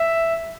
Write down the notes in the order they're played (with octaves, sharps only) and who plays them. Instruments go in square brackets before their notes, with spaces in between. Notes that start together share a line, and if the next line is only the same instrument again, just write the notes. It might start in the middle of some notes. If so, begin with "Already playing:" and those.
Already playing: [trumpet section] E5